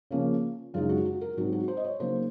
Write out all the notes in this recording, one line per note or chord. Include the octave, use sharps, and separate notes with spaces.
C#3 F3 A#3 C#4
F#2 C#3 G#3 D#4 F4
F#4
F#4
A#4
G#2 F#3 C4 D#4 F#4
F#4
C5
D#5
C#5
C#3 F#3 A#3 D#4 C5